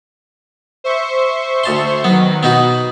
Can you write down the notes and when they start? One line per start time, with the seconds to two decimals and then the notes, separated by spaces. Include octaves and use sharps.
0.84 C5 E5 C#6
1.64 D2 A5 C6
2.04 D#3 F#3 B3
2.43 B2 B3 D#4 F#4